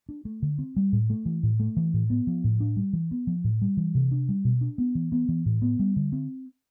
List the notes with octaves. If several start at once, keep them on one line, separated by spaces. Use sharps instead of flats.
D4
A3
D3
C4
G3
A2
A3
E3
A2
A3
E3
A2
B3
F3
A2
D4
G3
E3
B3
F3
A2
G3
E3
C3
D4
G3
B2
D4
B3
E3
B3
E3
A2
B3
G3
D3
C4